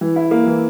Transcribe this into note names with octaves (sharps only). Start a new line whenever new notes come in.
E3
E4
A#3
E3